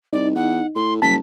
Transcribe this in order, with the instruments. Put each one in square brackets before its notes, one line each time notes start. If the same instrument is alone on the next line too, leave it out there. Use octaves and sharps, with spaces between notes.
[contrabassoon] C2 [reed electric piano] D#4 [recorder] D5
[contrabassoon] E2 [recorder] F#5
[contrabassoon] A2 [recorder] C6
[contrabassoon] F#1 [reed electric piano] G3 A5 [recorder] B6